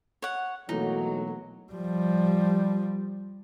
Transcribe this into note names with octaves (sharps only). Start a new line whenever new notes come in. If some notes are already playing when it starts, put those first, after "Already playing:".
C#5 F#5
B1 E3 F#3 A3 A#3 D#4
F3 G3